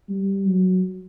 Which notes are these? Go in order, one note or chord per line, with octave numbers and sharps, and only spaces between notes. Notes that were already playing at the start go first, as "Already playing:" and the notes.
G3
F#3